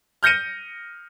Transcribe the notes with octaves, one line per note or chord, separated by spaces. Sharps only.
F6 G6 A#6 C#7 D#7